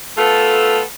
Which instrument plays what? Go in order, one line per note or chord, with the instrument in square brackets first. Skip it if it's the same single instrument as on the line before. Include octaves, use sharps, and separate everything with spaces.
[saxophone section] A3 B3 F4 A4